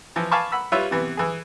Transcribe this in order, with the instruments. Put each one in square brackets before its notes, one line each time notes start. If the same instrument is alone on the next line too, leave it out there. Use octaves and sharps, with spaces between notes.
[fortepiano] E3 F3
F5 G#5 A5 B5 C#6 D6
F#5 B5 E6
G3 F4 B4 C#5 E5
C3 E3 B3
E3 G#4